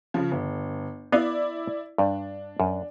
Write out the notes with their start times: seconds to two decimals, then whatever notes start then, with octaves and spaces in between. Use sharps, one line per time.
0.14 C#3 F3
0.31 G1
1.12 B3 E4 D5 D#5 F5
1.98 G2 D4
2.60 F#2